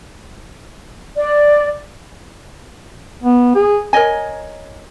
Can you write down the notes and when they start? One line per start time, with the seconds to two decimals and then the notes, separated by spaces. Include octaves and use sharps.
1.16 D5
3.24 B3
3.55 G#4
3.93 A#4 C#5 D#5 G#5